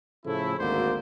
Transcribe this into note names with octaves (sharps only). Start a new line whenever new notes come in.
A2 C#3 F3 A3 E4
G#1 D2 A#3 F#4 C5 D5